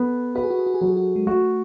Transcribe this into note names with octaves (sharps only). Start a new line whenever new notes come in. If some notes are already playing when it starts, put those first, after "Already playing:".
Already playing: B3 A4
F#4 B4
G#4
F#4
G#4
F#4
G#4
F#3 F#4
G#4
F#4
G#3
A3 F#4